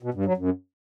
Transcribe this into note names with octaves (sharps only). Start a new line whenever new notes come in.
B2
G2
F#3
F#2